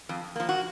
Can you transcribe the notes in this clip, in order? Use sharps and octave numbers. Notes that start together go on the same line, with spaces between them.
F2
F3 A#3
F#4